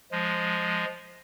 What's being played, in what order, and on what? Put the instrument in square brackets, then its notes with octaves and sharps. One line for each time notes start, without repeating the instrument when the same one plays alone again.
[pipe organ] F3 G#3